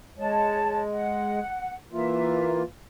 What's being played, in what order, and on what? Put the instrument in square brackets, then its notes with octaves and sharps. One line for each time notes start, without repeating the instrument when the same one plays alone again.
[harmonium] G#3 [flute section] C#5 A5
[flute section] F#5
[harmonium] E3 A#3 F4 [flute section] E5